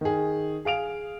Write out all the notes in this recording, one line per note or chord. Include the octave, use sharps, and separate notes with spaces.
D#3 G#4
G#4 F5 D7 F7